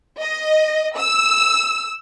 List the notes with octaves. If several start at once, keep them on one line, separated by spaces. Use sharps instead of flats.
D#5
E6